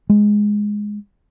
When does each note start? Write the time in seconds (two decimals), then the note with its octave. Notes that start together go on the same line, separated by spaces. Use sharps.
0.10 G#3